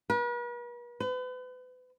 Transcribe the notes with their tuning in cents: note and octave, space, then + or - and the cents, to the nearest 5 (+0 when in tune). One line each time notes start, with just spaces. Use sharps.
B4 -45
B4 +35